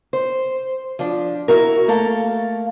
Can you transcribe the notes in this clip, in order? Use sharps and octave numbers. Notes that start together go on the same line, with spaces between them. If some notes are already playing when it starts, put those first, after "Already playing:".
C5
F3 D4
E4 F#4 A#4
A3 A#3 A4 F5